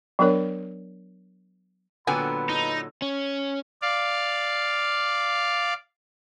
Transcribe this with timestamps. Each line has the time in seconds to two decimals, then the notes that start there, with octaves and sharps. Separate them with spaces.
0.19 F#3 B3 D4 A#4 C#5
2.07 A#2 D3 F#3 B3 G5 G#5 B5
2.49 D#4
3.02 C#4
3.82 D5 F5